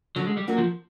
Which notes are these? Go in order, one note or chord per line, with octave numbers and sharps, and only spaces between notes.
D3 F#3
G#3
G3
F#3 A#3 D4 F#4
F3